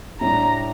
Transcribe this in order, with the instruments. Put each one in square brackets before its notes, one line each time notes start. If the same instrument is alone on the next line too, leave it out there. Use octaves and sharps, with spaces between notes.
[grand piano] A2 G3 D4 [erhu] A#5